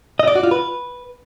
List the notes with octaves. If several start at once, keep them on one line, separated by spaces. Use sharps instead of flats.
D#5
D5
F#4
F4
B4